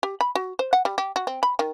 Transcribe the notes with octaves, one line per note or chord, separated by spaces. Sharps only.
G4
B5
F#4
C5
F#5
G3
G4
F#4
C4
B5
D#3